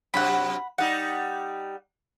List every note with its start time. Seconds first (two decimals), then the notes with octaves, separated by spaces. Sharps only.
0.14 F#2 C3 F#3 F#5 B5
0.78 G3 D#4 F#5